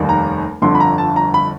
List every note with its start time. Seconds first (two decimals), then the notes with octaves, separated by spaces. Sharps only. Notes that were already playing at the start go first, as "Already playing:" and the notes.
Already playing: F1 D#2 D#3 G3
0.09 A#5
0.62 G1 F2 D3 C6
0.75 B5
0.80 A#5
0.98 A5
1.16 A#5
1.34 B5